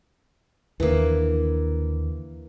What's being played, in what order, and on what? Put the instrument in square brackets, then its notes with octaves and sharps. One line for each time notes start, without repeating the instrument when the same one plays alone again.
[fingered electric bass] D#2 D3 D4 [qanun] E3 A#3